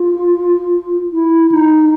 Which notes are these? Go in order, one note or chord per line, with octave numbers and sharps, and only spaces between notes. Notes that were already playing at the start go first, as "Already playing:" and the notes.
Already playing: F4
E4
D#4